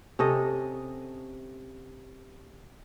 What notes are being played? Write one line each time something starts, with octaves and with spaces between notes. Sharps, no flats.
C3 C#4 A4 D#5